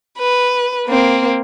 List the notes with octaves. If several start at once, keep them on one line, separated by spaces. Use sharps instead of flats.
B4
A#3 C4